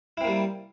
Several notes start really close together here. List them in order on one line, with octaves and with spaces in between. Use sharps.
E4 C4 A#3 G3